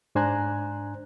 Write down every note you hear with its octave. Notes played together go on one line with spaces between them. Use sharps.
G#2 D4 C5 G#5 A#5 F#6